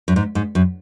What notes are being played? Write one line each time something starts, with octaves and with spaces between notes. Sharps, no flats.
F#2
G#2
G#2
F#2